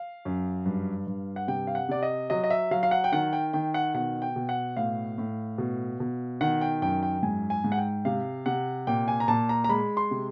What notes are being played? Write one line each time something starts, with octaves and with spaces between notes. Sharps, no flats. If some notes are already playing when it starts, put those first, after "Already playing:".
Already playing: F5
F#2
G2
G2
F#5
C3 G5
F5
F#5
C3 D5
D#5
F#3 D#5
D#5
E5
F#3 F5
F5
F#5
G5
D#3 F#5
G5
D#3 G5
F#5
B2 F#5
G5
B2
F#5
A2 F5
A2
B2
B2
D#3 F#5
G5
F#2 G5
G5
G#2 G#5
G#5
G#2
F#5
G5
C3 F5
C3 F#5
A#2 G5
G#5
A#5
A#2 A5
A#5
A#5
G#3 B5
C6
C3